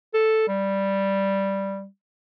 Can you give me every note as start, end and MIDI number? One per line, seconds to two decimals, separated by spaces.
0.14 0.48 69
0.48 1.85 55